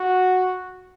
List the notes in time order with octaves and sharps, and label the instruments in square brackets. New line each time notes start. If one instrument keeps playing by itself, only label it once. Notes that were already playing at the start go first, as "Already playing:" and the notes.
Already playing: [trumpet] F#4